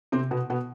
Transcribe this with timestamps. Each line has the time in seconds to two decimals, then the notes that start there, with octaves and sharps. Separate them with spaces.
0.12 C3 C4
0.31 B2 B3
0.50 B2 B3